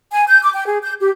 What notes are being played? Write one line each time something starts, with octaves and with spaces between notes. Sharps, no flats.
G#5
G6
D6
G5
G#4
G6
G4